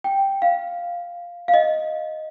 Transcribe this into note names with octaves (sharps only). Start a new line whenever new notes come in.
G5
F5
F5
D#5